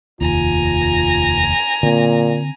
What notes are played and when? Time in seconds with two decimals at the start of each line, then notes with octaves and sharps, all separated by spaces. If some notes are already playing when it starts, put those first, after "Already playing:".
0.21 F1 D#2 F4 G#5 A#5
1.83 A#2 D3 C4